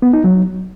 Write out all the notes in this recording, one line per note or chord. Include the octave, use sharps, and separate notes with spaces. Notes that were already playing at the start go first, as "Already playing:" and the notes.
B3
D#4
F#3